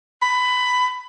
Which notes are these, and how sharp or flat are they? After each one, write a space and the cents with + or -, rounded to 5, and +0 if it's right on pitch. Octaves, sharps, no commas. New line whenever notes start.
B5 +15